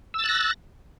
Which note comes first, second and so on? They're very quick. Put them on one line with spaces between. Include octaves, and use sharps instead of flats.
E6 A6 F#6 A#6